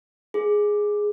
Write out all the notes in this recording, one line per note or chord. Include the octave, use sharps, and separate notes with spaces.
G#4